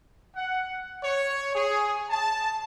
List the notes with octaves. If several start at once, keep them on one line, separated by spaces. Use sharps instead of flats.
F#5
C#5
G#4
A5